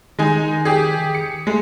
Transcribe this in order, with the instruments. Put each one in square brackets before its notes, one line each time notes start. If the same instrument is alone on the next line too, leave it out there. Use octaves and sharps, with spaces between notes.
[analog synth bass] D#3 [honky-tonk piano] G#3 D#4 G#5
[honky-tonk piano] G4 G#4
C#7
[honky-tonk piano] G#3 [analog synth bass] A3